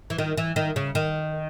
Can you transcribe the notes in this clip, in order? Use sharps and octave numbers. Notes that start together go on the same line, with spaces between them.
E3
D#3
E3
D#3
C#3
D#3